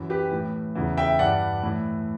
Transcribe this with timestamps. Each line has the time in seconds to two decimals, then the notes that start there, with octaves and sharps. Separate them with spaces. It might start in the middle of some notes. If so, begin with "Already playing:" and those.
Already playing: F#2 E3
0.10 G4 B4
0.31 A2 E3
0.75 E2 C#3 E3
0.97 E5 G5
1.19 G2 E3 D5 F#5
1.63 A2 E3